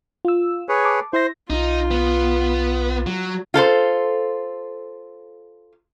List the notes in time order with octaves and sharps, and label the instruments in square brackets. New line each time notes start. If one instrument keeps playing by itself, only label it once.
[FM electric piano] F4 E6
[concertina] G#4 B4 C#5
[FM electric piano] A5 D6
[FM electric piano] E4 E5 A#6 [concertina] C5
[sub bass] B1 [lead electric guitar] D#4 [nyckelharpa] F4
[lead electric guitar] B3
F#3
[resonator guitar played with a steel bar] F4 A4 A#4 C5